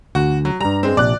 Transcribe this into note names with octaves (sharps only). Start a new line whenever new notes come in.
D2 F#4
F#3
G2 G3 A#5
G#3 C4
A#1 C3 D5 F#6